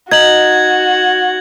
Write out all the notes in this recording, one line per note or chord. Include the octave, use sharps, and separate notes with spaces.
D#4 F#4 G#6 F#7